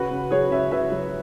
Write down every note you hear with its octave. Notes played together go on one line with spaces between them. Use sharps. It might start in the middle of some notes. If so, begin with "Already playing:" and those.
Already playing: C#3 F#4 B4
C#3
F#3 G#4 C#5
C#3 E5
C#3 B4 E5
F#3